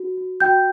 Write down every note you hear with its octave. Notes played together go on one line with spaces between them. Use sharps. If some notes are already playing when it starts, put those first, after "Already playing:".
Already playing: F#4
F#4
F#4 G5 G6